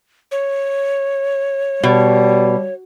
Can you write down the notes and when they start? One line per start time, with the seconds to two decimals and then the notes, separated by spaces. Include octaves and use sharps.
0.31 C#5
1.84 B2 G3